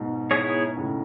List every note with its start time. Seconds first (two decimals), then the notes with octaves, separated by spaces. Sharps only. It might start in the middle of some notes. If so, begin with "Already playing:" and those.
Already playing: G#2 B2
0.31 B3 E4 G#4 C#5
0.76 A2 C#3